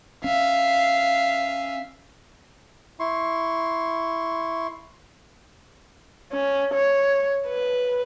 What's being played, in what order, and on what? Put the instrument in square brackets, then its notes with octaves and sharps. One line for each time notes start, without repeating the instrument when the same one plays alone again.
[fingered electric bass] C#4 [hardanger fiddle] E5 F5
[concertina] E4 C6 C#6
[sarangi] C#4
C#5
B4